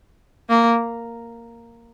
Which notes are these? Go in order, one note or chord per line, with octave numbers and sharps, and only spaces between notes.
A#3